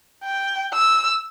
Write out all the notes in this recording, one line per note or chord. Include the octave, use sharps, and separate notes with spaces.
G5
E6